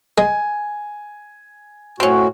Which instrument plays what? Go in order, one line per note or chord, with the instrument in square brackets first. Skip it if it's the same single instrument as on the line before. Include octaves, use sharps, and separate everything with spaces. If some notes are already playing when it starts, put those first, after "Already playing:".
[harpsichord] G#3 [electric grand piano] G#5
[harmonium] A2 F#4 [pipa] C4 C#4